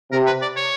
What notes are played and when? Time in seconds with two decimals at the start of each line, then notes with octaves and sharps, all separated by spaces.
0.11 C3 A#4
0.26 B4
0.42 D5
0.56 C#5